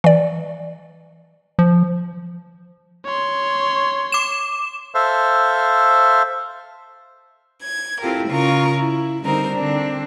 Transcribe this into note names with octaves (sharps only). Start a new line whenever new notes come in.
E3 D5
F3
C#5 C6
D6 E7
A4 C5 E5 F5
G#6
C4 E4 F4 G4 A4 A#4
C#3 F4 A#4 A#5 C#6
E4
D3 G3 C4 D#4 A#4 C5
D3 C4 D4